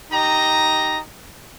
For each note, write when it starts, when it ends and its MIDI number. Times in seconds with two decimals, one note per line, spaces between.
0.11 1.00 63
0.11 1.00 67
0.11 1.00 75
0.11 1.00 82